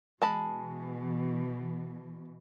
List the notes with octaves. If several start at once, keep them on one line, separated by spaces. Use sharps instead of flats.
B2 E3 G#3 A5 B5